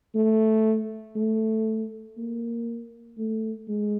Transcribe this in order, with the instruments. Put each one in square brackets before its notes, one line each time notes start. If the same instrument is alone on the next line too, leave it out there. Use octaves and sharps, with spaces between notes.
[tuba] A3
A3
A#3
A3
G#3